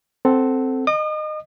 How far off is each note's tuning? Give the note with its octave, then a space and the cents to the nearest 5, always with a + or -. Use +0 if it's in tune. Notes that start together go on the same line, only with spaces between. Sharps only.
C4 +0 A4 +0 F#5 +20
D#5 -20 D#6 -45